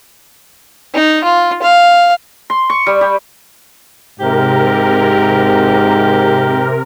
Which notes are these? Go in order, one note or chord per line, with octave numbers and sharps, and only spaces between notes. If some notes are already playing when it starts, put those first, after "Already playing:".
D#4
F4
F5
C6
C#6
G3
G4
G#2 C3 G4 A#4